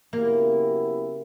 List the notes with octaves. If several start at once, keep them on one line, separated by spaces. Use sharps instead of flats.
C#3 F#3 A#3 B3 E4 G4